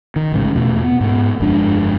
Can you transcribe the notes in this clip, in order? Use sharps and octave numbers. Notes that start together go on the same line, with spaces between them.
D#3
A1 G#2 C#3
E2 B2 A3
B3
G#2 B3
G1 F2 G#3 D4